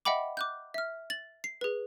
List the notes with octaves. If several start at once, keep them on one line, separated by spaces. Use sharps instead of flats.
D#5 E5 F#5 G5 B5 D6
D6 F#6 G6
E5 F6
A6 F#7
C7
G#4 B4